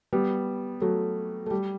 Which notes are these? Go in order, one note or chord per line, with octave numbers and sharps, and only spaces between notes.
G3 B3
F#3 A3
A3
G3